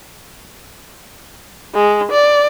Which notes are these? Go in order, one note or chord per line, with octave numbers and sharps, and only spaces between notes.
G#3
D5